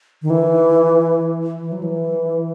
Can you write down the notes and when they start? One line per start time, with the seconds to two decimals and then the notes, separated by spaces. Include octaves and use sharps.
0.22 D#3
0.30 E3
1.61 E3
1.72 F#3
1.83 E3